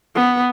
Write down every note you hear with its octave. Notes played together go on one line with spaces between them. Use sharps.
B3